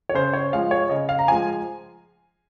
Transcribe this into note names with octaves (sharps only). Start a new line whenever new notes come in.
C#5
C#3 C5
C#5
F3 G#3 F5
C#5
C#3 D#5
F5
A#5
F3 G#3 G#5